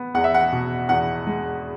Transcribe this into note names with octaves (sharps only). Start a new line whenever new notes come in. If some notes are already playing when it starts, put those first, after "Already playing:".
Already playing: B3
E2 F#5
E5
F#5
B2
E2 F#5
G#3